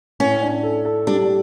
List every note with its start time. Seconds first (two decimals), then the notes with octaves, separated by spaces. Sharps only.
0.20 A2 C#4
0.42 D4
0.63 A4
0.85 A4
1.07 G3 D4